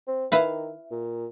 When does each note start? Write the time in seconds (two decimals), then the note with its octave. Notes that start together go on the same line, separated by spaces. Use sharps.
0.08 C4
0.32 D#3 E4 B4 F5
0.91 A#2